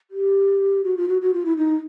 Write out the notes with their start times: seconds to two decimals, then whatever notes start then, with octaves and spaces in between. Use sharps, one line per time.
0.11 G4
0.84 F#4
0.97 F4
1.09 F#4
1.21 F#4
1.34 F4
1.46 E4
1.57 D#4